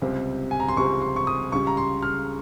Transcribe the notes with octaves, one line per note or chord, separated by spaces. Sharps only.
C#2 C3 G3 C4
G#5
A#5
C6
C#2 C3 G3 C4 C#6
C6
C#6
D#6
C#2 C#3 G3 C#6
A#5
C6
F6